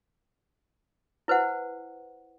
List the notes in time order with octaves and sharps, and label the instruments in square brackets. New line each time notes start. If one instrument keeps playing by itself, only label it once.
[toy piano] E4 B4 C5 F#5